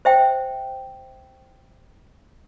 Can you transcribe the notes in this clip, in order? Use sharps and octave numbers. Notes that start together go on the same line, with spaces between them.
C5 E5 G5